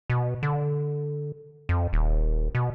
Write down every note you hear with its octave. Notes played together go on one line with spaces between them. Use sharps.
B2
D3
F2
D#1
B2